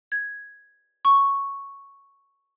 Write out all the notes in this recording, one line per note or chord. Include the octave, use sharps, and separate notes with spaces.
G#6
C#6